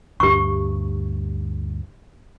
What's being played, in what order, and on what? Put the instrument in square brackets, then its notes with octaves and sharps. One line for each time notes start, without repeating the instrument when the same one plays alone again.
[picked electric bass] D2 G2 [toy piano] G4 C#6